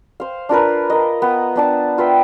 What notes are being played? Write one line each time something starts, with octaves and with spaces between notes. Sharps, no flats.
C5 F5
D4 F4 A#4 B4
A#4 D#5
B3
B3 D4 A5
F4 B4 E5 G5